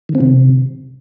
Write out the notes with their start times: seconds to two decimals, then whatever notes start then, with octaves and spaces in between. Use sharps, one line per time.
0.09 D#3
0.15 C4
0.21 C3